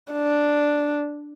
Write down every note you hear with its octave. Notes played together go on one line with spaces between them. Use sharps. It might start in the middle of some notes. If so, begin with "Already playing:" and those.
D4